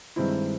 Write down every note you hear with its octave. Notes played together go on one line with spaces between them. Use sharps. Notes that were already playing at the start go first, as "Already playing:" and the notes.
G2 D#3 G#3 C4 E4